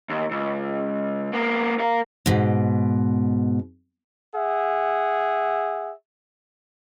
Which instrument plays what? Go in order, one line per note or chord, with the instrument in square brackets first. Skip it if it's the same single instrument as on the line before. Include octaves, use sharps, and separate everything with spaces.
[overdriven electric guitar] D#2
C#2
A#3 B3
A#4 F5
[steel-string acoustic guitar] G#2 B2
[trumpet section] G#4 E5 F#5